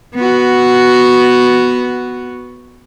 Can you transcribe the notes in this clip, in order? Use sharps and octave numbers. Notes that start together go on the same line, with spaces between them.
B3 F#4